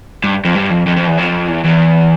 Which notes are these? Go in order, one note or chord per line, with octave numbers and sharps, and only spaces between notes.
G2
F2
G2
F2
F2
F2
E2
F2
E2
E2